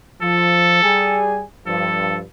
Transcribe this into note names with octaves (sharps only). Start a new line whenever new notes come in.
F3 A4
G3 G#4 G#5
G2 F3 A4